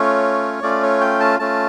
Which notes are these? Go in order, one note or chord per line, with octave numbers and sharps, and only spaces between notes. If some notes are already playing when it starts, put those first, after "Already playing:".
Already playing: A3 C#4 F4 C#5
A3 C#4 F4 D5
C#5
G5
A5
A3 C#4 F4 A5